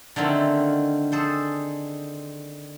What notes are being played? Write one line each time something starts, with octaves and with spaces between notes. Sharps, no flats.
D3 D#3 A3 C4 C#4
G#4 A4 C5